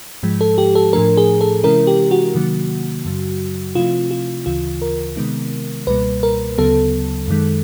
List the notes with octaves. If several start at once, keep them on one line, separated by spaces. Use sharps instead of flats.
G#2 F3 G#3
A4
G4
A4
A2 F3 A3 D4 A#4
G#4
A4
C3 E3 G#3 C#4 E4 A#4
G4
F#4
C3 D#3 F#3 A#3
F#2 C#3 F#3
C3 F3 A3 C4 E4 F4
F4
D2 C#3 E3 F4
A#4
C3 D#3 G#3 B3 D#4
C#2 B2 G3 A#3 B4
A#4
D2 C#3 F#3 B3 A4
F#2 D#3 G#3